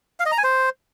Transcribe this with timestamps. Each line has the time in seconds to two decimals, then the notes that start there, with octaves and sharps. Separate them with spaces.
0.20 F5
0.26 D#5
0.32 A#5
0.38 G#5
0.44 C5